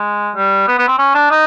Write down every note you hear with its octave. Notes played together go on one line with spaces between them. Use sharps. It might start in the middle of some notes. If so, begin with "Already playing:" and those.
Already playing: G#3
G3
B3
B3
C4
C#4
D4
D#4